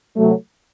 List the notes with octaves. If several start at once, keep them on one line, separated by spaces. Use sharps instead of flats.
C3 F#3 A3